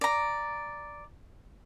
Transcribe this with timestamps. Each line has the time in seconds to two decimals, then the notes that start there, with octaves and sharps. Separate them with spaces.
0.01 D5 A#5